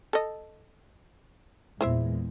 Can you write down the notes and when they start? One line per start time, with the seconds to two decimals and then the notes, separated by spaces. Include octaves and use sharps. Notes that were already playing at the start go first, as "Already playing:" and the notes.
0.13 A4 D#5
1.81 E2 A#2 G#3 E4 C5 E5